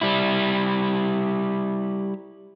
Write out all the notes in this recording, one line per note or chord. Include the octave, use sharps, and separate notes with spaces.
G3 E4